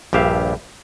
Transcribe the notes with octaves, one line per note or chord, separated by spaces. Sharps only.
A#1 G2 G4 E5 F5